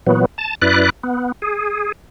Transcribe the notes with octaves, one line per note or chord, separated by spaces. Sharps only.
A#2 E3 F#3 B3
A5
F#2 E4 B4 D5 F#6
B3
G#4